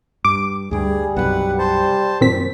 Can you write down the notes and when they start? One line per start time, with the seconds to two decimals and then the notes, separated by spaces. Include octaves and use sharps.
0.25 G2 D6
0.71 D2 G2 G3 G#4
1.16 B1 F#2 C3 B4 F#5
1.59 C5 A5
2.21 F#2 A#2 D#3 C4 B6